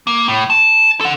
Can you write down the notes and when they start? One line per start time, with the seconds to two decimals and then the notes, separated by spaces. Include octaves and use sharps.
0.07 A#3
0.28 A2
0.50 A5
1.01 A4 F#5